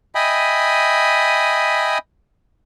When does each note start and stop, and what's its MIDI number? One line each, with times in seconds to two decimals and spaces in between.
0.15 1.98 75
0.15 1.98 76
0.15 1.98 79
0.15 1.98 80
0.15 1.98 83
0.15 1.98 87